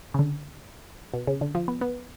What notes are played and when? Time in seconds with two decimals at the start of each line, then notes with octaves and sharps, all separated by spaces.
0.14 C#3
0.19 D3
1.14 B2
1.27 C#3
1.41 D3
1.55 F3
1.68 B3
1.81 B3